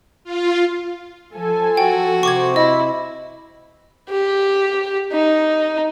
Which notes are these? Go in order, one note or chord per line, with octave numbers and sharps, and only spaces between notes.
F4
F3 A4 G#5
F#4 G5
C3 C4 C#6 D6 G#6
E4 D#5
G4
D#4